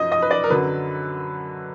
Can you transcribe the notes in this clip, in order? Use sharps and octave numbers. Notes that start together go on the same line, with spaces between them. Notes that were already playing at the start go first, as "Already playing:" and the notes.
Already playing: F#2 F3 D#5
D#5
B4
D5
A#4
F#2 D3 F#3 B4